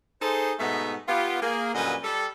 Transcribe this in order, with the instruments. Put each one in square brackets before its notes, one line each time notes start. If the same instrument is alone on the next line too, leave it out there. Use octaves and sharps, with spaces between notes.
[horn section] D#4 G#4 A4 C5
G#2 B2 A3 B3 D#4 E5
B3 F4 G4
A#3 G#4
F#2 A#2 D3 G3 B4 D#5
G3 A4